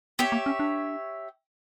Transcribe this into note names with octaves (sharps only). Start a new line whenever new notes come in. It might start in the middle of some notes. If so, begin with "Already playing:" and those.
B3 G4 C#5 E5
A#3
C#4
D4